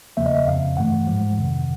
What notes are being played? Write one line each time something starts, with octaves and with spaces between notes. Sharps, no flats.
E2 C#3 F3 A#3 E5
D#5
E5
F2 C#3 F3 F5
G2 E3 A3 F#5
G#2 F3 G#3
F2 C3 D#3